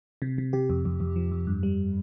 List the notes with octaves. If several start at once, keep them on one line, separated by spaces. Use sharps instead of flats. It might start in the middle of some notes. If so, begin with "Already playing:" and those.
C3
C3
C3 G4
F2
F2
F2
F3
F2
G2
G3